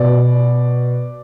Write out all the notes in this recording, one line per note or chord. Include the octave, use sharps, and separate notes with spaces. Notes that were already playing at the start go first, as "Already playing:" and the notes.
Already playing: B2 D5